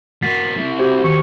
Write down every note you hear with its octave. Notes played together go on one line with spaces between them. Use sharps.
A#3 F#4 A6 B6 C7
C3 E4
F#4 G4 C5
D#2 C#6